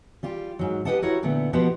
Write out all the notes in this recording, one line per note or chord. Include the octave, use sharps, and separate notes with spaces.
G3 F4 G4
G#2 F#3
G4 G#4 B4 D#5 F#5 A5
E4 F#4 G4 A#4 C#5
A#2 D3 A3 B3
B2 F3 B3 F#4 G4 C5